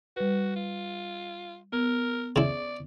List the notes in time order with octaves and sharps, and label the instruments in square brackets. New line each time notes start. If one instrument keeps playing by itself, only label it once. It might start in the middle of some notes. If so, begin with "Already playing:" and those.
[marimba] G3 B4 [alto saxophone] F#4
[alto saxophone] F4
[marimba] B3 [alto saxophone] A#4
[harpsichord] C#3 E4 [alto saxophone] D5